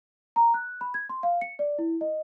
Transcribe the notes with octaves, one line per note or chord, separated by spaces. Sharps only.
A#5
F#6
B5
G#6
C6
F5
C#7
D5
E4
D#5